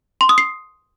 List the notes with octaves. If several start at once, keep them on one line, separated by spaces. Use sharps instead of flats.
C6
D#6
C7